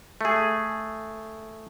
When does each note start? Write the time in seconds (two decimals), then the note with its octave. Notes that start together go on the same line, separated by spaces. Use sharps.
0.21 A3 G#4